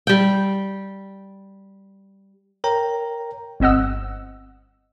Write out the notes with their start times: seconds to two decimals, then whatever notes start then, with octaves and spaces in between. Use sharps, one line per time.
0.07 G3 G5
2.64 A#4 C#5 G5 A#5
3.60 G1 C4 D#5 F#5 E6